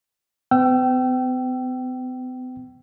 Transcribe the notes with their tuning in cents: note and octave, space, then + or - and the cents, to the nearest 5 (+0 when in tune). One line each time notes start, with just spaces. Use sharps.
B3 +45 G5 -25 E6 +25